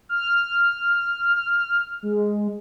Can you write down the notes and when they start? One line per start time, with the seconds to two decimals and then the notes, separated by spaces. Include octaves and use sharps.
0.09 F6
2.03 G#3